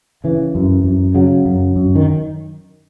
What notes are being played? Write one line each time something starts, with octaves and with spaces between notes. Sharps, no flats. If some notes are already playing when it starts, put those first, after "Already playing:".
C#3 E3
F#2
F#2
C#3 F#3
F#2
F#2
D#3